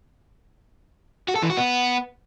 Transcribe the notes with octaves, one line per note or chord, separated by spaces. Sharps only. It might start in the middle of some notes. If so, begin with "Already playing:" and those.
F#4
A4
E3
F#4
B3